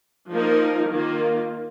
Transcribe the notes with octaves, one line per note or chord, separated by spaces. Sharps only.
F3 A#3 D#4 A#4
D#3 A#3 F4